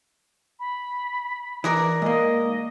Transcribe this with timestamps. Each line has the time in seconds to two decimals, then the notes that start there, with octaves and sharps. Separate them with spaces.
0.60 B5
1.64 E3 A#4 D5 D#6
2.02 G#2 A#3 D#5